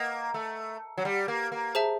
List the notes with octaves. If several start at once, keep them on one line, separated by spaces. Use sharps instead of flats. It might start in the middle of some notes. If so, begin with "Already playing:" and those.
Already playing: A#3 D#5 F#5 A#5 D#6
A3
F#3
G3
A#3
A#3
G#4 C5 E5 A5